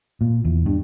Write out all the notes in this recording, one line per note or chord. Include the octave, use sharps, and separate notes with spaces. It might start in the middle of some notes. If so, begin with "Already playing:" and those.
A#2
E2
G2